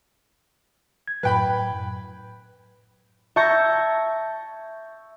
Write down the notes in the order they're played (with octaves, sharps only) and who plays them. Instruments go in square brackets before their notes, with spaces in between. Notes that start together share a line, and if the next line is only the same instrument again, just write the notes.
[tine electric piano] G#6
[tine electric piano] F#2 A2 F#3 [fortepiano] B4 G5 B5
[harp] E5 A5 C#6 G6 G#6 A#6